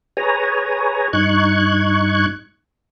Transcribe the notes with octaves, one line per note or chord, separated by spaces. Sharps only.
G#4 B4 C#5 G#5 A#5
G2 D#4 C#6 F#6 G#6